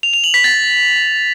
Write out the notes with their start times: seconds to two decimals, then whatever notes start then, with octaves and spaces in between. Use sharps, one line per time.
0.03 F7
0.13 F7
0.24 F#7
0.34 B6
0.44 A6